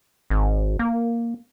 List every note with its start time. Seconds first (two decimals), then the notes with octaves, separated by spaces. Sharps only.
0.30 G#1
0.79 A#3